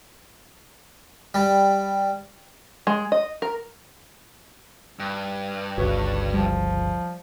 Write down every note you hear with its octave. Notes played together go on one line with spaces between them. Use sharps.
G3
G#3
D#5
A#4
G2
G1 C#2 F#4 B4 C#5
F3 G3